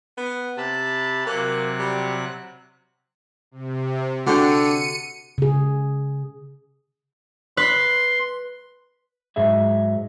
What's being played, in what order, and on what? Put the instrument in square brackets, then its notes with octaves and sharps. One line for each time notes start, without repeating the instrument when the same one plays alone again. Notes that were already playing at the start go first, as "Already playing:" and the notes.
[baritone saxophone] B3
[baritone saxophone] C3 [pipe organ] A5 B5
[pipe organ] C3 F#3 F#6 [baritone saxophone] A#3
[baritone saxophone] G3
[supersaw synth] C3
[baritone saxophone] D3 [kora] F#4 A4 G5 [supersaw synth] C#7 D#7
[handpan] C#3 G#4
[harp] B4 [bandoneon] C6
[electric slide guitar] G#2 F#3 G#4 E5